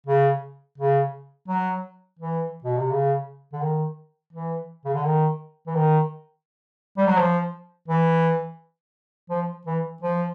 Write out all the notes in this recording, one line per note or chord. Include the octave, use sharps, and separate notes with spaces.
C#3
C#3
F#3
E3
B2
C3
C#3
D3
D#3
E3
C#3
D3
D#3
E3
D#3
G3
F#3
F3
E3
F3
E3
F3